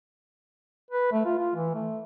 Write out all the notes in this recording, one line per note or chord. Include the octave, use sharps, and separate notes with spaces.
B4
A3
F4
F4
E3
A3